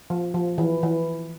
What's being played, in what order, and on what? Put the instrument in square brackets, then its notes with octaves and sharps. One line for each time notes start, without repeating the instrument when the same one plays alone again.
[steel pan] F3
F3
E3
E3